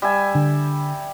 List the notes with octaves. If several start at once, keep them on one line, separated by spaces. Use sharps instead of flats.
G3 E5 G#5
D3